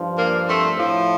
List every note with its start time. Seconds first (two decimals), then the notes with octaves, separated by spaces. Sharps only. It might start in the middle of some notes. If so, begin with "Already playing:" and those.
Already playing: G2 F3
0.17 A#3 D4
0.47 A3 C4
0.77 A2 F3